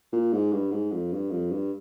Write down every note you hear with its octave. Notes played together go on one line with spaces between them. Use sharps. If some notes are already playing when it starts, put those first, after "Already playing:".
A#2
G#2
G2
G#2
F2
G2
F2
G2